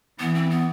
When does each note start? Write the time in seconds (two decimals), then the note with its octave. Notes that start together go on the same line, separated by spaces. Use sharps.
0.19 E3 B3
0.35 C4
0.50 B3